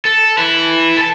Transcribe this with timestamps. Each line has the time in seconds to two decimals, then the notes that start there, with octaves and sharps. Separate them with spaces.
0.05 A4
0.38 E4 B4
0.97 A4 A5